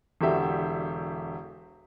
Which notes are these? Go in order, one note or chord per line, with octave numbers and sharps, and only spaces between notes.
E1 D3 F#4 G4 E5